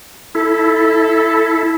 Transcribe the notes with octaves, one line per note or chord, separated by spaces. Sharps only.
E4 A4